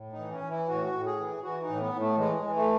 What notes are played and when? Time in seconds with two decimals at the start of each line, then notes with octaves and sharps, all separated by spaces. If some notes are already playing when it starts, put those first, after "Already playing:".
Already playing: A2
0.13 D#4
0.18 E3
0.32 C#4
0.44 E3
0.50 E4
0.68 A2 F#4
0.93 A2
1.06 G#4
1.19 E3
1.43 E3 F#4
1.62 D#4
1.68 A2
1.81 B3
1.94 A2
1.99 A3
2.17 E3 G#3
2.43 E3
2.56 A3